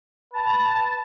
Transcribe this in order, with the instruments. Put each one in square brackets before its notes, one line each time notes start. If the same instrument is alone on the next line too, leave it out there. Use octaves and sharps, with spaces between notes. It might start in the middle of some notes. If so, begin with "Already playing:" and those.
[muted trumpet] B4 [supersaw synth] A5